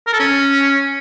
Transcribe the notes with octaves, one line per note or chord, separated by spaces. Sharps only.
A#4
A4
C#4